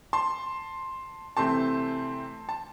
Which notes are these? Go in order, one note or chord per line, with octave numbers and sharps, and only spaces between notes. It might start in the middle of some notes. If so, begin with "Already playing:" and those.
A5 C6
C3 E3 A3 C4 A5 C6
A5